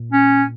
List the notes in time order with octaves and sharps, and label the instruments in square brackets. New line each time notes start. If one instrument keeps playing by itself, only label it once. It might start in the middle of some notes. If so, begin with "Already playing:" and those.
Already playing: [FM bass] A#2
[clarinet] C#4